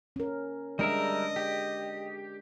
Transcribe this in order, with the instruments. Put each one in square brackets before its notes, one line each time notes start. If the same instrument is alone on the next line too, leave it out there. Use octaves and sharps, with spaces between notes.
[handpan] C#4 A#4
[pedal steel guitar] G3 A#4 E5 [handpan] G#3 D4 [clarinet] D#5
[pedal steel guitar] G4